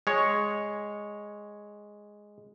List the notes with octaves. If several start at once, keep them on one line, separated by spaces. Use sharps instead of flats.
G#3 C#5